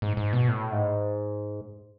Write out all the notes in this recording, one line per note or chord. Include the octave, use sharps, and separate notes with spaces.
G#2
G#2
B2
A2
G#2